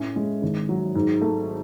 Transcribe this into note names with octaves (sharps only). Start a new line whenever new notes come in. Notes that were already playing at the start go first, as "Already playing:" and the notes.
Already playing: A2 C#4
G#3
G#1
F#3
G#2
A3